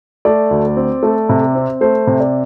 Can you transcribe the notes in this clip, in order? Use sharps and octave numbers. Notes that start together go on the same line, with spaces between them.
A3 D5
D2
C4
A3
C3
C4
A3 C5
C3
D5